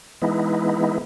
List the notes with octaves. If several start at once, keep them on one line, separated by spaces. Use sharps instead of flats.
E3 G#3 B3 D#4 E4